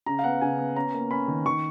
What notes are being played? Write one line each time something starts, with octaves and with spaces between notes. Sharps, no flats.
C#3 A#5
F5
B3 F#5
C#3 G#5
B3
C#4 A#5
A#3
C#4 B5
D#3
D#3 C#6